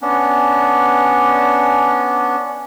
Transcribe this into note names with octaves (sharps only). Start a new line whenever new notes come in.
B3 C#4 D4